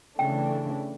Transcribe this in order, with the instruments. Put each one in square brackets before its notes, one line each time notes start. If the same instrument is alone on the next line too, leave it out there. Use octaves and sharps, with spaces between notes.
[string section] C#3 E3 A3 D4 [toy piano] G5